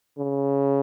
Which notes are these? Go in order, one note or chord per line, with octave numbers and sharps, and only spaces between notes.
C#3